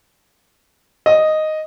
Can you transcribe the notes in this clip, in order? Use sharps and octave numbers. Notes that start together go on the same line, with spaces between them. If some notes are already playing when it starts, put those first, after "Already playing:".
D#5